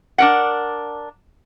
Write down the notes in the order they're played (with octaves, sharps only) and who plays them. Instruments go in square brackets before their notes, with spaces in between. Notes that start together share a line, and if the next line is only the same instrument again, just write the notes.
[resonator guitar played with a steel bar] D4 A#4 F#5